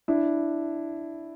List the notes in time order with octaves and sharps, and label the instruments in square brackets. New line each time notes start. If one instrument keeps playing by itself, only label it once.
[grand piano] D4 E4